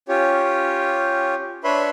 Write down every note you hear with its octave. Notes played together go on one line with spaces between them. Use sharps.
C#4 F4 G4 C#5
D4 B4 C#5 E5 B5 C6